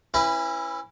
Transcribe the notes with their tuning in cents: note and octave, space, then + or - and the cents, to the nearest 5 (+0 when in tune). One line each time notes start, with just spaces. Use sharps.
C#4 -30 E4 +10 B4 +0